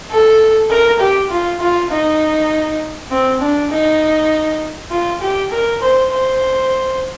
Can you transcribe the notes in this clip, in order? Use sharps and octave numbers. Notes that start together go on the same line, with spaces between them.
A4
A#4
G4
F4
F4
D#4
C4
D4
D#4
F4
G4
A#4
C5
C5